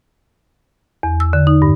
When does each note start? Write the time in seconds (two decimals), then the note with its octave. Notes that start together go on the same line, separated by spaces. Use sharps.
1.03 E2
1.20 E6
1.33 D3
1.47 D#4
1.62 G2